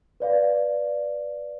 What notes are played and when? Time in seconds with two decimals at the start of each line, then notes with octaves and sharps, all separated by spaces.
0.20 B4 D5 F5